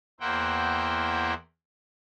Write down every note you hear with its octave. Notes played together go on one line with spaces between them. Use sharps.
E2 A#3 E4 C5 F#5 G5